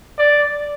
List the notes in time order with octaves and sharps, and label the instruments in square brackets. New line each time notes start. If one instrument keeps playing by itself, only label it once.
[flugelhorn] D5